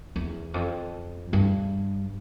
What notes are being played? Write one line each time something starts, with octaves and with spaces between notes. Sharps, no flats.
E2
F2
G2